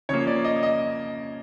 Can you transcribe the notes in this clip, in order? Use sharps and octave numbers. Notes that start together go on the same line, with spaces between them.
C#3 F3 A#3 C#5
D5
D#5
D#5